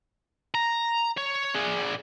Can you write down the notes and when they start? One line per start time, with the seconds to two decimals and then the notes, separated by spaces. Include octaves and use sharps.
0.55 A#5
1.17 C#5
1.54 D4 G#4